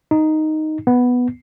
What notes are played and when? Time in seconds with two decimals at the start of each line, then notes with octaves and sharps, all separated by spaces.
0.11 D#4
0.87 B3